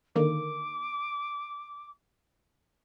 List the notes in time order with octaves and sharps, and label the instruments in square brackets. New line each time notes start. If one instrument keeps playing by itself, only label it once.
[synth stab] D3 D#3 A#3 [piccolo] D6